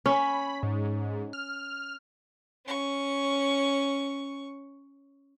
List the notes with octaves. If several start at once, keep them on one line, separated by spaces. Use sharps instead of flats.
C#4 B5
G#2
F6
C#4 C#6